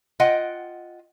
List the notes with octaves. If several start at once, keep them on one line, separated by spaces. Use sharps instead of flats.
F4 D#5 F#5 G5